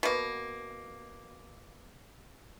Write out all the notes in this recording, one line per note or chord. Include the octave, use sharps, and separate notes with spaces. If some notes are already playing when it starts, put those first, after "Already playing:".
B2 A#3